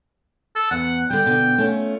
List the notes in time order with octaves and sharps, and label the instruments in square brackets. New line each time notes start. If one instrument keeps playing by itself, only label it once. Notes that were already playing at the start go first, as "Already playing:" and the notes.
[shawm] A4
[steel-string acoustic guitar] E2 [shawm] F#5
[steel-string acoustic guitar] D3 G3 [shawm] G5
[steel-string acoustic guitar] B2 D3
A3 C#4 F4